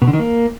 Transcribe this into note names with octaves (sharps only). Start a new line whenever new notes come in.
B2
D3
D#3
A#3